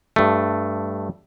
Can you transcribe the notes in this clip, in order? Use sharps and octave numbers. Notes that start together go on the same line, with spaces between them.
G2 A3